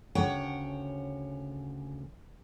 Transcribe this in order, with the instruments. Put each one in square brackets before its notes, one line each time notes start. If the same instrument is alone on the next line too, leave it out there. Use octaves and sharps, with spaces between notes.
[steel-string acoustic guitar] D2 C#3 C#5 F#5 G5